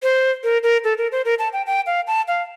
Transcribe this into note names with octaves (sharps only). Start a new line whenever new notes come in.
C5
A#4
A#4
A4
A#4
C5
A#4
A5
G5
G5
F5
A5
F5